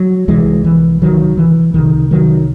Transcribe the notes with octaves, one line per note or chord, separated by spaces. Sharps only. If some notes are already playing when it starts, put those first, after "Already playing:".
Already playing: F#3
C2 C3 E3 G#3
E3
D#3 F#3
E3
C2 C3 D#3
D#3 F#3